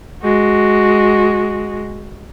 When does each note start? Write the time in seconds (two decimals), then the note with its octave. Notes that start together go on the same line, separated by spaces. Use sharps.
0.22 G#3 F#4